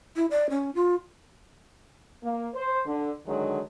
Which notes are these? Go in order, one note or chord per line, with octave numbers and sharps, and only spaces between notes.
E4
D5
C#4
F4
A#3
C5
D3
D3 D#3 F#3 G#3